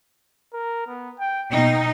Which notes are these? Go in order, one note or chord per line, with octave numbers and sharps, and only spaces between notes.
A#4
B3
G5
B2 D#4 G5